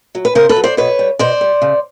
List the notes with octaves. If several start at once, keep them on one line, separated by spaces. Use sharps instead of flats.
F#3
B4
C#3 A#4 C5
A4 B4
F#3
C5 D5
B2 B4 C#5
G3
B2 C5 D5
G3
C#3